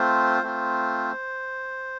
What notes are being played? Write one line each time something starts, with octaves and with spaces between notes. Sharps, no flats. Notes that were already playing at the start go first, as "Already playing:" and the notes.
Already playing: A3 C4 F4 C5
A3 C4 F4